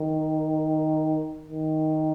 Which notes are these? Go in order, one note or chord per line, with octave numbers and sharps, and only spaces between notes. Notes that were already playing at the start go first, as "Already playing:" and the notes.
Already playing: D#3
D#3